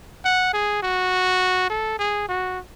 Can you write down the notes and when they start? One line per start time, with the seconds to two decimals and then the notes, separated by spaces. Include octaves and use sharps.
0.25 F#5
0.53 G#4
0.83 F#4
1.70 A4
1.99 G#4
2.29 F#4